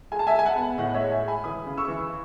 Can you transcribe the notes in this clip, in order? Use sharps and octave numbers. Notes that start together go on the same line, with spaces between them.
G#3 G#5
A5
E5 G#5
G#3
G#5
F#5 A5
B3
A2 D#5 F#5
F#5
C#5 E5
G#3
E5 G#5
G#3
G#5 B5
E3 B5 D#6
C#3
C#6 E6
E3